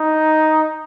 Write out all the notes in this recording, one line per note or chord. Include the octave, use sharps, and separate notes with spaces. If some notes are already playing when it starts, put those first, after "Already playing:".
Already playing: D#4